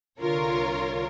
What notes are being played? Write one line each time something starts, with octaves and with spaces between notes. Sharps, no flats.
C2 D3 F4 A#4 C#5